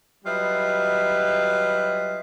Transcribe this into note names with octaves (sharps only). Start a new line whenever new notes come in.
F#3 G3 F4 B4 D#5 E5